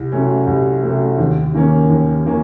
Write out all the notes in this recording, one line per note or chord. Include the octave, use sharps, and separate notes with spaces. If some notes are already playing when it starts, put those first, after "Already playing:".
Already playing: C2
C3 F#3 A3 C#4
C2
C3 F#3 A3 C#4
D#2
D#3 A#3 C#4
D#2
D#3 A#3 C#4